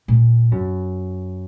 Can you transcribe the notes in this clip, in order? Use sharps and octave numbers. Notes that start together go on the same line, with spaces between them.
A#2
F#2